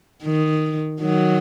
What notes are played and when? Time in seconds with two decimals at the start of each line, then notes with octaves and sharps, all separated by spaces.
0.23 D#3
1.01 D#3 F#3